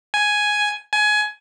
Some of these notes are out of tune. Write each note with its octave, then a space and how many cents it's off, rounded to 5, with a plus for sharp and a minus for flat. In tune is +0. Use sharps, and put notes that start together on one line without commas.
G#5 +5
G#5 +20